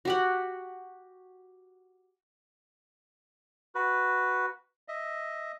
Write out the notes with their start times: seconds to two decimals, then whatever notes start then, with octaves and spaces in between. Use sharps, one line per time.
0.05 F#4 G4 F#5
3.75 F#4 B4
4.88 D#5 E5